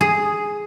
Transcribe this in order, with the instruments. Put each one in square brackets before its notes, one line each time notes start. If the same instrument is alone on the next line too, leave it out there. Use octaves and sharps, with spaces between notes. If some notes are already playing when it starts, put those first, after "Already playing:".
[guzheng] G#4